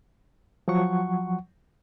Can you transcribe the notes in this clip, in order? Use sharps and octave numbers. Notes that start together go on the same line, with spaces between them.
F3 F#3 F#5 C#6